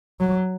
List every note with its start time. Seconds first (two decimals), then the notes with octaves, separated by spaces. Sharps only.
0.20 F#3